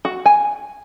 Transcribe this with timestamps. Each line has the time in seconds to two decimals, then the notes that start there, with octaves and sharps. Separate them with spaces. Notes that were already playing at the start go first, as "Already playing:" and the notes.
0.05 F#4
0.26 G#5